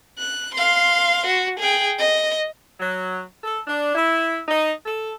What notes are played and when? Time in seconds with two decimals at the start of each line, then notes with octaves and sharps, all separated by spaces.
0.19 F#6
0.55 F5 C6
1.26 F#4
1.60 G#4 G5
1.99 D#5
2.80 F#3
3.44 A4
3.68 D4
3.95 E4
4.48 D#4
4.86 A4